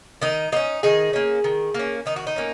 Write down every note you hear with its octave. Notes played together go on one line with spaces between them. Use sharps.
D#3 D#4
A#3 C#4 D#4
D#3 D#4 G#4
A#3 C#4
D#3
A#3 C#4
D#3 D#4
F#4
D#4
A#3 C#4